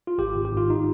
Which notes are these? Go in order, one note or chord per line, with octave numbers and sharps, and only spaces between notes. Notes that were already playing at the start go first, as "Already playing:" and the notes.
F4
G#1 G4
G#1
G4
G#2 F4
D#4